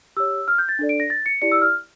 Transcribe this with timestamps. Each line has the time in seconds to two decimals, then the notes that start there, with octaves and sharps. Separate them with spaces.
0.17 G4 C#5 E6
0.48 F6
0.58 G6
0.69 A6
0.79 D4 A4 D5
0.89 D7
1.00 A#6
1.10 A6
1.26 C#7
1.42 E4 G4 D5 C#7
1.52 E6
1.62 F6